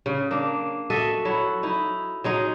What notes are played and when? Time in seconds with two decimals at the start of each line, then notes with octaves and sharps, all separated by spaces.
0.06 C#3
0.31 A#3 D4
0.90 F#4 A4 D#5 E5
1.25 F#3 E4
1.63 D#4 E4
2.24 F#3 G#3 D#4